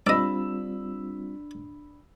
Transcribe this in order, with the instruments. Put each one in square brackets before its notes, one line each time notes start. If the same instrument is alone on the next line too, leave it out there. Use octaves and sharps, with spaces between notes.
[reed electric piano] G3 C4 F4 [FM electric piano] D4 [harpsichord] D5 D#5 [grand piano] B5 E6